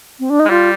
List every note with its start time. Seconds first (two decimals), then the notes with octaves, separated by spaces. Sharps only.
0.20 C4
0.30 D4
0.40 D#4
0.46 G#3
0.50 G3 F4